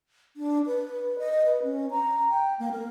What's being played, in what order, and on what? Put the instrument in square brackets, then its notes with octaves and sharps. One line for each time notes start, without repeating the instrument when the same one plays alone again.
[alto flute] D4
B4
D#5
B4
C#4
A#5
G5
A#3
A#4